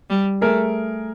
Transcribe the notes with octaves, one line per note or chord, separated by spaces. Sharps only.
G3
A3 G#4 A#4